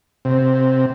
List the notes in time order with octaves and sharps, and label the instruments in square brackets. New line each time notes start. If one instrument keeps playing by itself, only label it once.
[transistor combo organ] C3